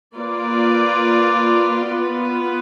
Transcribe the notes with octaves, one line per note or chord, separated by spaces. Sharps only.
A#3 F4 B4 D5
B3 F4 B4